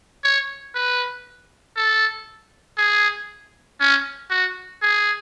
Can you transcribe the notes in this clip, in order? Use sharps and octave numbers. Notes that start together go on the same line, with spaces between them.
C#5
B4
A4
G#4
C#4
F#4
G#4